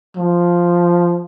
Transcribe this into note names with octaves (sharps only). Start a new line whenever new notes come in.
F3